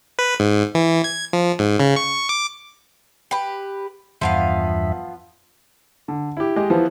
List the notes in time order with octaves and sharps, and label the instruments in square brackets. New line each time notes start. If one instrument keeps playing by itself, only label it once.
[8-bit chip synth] B4
G#2
E3
G#6
F3
G#2
C#3
C#6
D6
[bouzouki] G4 B4
[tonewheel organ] E2 G2 E5 [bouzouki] F3 B3 F5
[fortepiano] D3
E4 G4
G#3 G4 D#5
E3 F3 B3